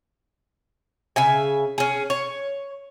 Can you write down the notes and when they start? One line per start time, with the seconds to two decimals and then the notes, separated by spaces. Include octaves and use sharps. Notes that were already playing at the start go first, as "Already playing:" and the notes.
1.16 C#3 E5 G#5
1.78 C#4 G#4
2.10 C#5